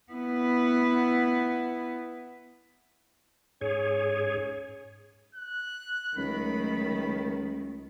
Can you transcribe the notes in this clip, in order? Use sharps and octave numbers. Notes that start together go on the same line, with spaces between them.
B3 E4
G#2 C#4 G#4 C#5
F#6
C#2 D#3 F#3 A3 B5